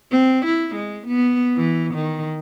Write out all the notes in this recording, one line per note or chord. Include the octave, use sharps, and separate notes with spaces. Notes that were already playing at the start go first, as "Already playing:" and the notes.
C4
E4
G#3
B3
E3
D#3